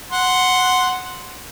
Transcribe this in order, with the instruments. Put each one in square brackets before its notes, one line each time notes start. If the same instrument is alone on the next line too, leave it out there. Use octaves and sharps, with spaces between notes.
[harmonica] F#5 C6